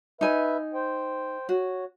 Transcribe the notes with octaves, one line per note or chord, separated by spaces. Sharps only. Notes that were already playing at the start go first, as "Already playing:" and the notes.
D#4 B4 E5 G#5
C5 G5
F#4 C#5